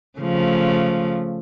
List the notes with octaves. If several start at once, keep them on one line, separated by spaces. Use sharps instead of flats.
C#3 F3 A3